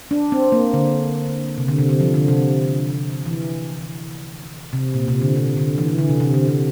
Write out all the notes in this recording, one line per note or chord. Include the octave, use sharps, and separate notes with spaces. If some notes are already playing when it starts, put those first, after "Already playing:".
D4
C4
A#3
D3
C3
D3
C3
D3
F3
D3
C3
E3
C3
A#2
C3
D3
C3
D3
E3
E3
D3
C3
C3
D3
C3